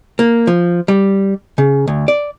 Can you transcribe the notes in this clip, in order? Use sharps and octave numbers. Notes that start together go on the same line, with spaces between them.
A#3
F3
G3
C#3
D2
D5